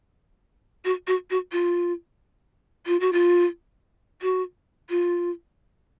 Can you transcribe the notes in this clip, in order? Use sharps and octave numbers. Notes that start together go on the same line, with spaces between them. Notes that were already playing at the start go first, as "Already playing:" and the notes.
F#4
F#4
F#4
F4
F4
F#4
F4
F#4
F4